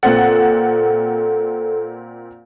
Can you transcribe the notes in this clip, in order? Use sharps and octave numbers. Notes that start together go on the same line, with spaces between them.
A#2 C4 A4 F#5